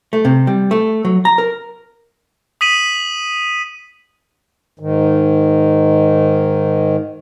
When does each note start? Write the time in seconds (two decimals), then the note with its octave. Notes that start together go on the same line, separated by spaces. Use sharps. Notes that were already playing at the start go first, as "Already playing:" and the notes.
0.13 A3
0.25 C3
0.47 G3
0.71 A3
1.05 F#3
1.25 A#5
1.38 A#4
2.61 D#6 B6 D#7 F#7
4.79 G#2 D#3